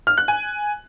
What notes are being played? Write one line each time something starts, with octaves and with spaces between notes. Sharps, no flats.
F6
F#6
G#5